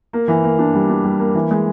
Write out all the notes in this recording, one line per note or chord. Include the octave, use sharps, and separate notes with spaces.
A#3
E3
A#3
D4
G3
D4
G3
A#3
E3
G#3